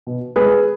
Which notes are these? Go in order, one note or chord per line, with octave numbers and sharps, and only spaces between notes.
B2
G#3 G#4 B4